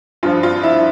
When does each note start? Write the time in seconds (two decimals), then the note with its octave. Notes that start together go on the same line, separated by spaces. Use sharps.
0.23 G2 F3 F4
0.43 F4
0.63 E4